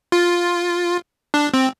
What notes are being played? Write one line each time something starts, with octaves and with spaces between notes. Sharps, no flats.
F4
D4
C4